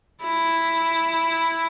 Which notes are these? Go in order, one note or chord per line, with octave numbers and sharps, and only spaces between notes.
E4